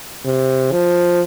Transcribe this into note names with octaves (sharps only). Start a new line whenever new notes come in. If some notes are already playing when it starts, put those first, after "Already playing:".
C3
F3